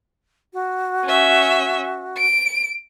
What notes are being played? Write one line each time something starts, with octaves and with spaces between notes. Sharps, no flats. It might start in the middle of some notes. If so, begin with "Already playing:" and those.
F#4
C#4 E5
D7